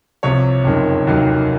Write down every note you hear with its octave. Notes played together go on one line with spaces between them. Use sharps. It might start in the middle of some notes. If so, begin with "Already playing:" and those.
C2 C3 F3 C#5
F#1 F2 D#3
F1 D#2 D#3 F#3